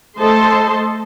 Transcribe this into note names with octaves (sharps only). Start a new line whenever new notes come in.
A3 A4 C5 D#5 A5 C6